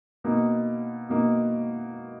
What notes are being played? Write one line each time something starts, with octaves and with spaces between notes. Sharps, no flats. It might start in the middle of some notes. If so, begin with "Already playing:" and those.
B2 A#3 D#4
B2 A#3 D#4